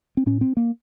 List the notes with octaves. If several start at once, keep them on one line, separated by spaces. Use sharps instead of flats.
C4
A2 C#4
C4
A#3